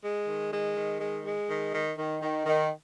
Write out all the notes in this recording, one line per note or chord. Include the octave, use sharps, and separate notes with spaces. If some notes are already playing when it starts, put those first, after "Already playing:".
G#3
D#3
G#3
D#3
G#3
G#3
D#3
D#3
D#3
D#3
D#3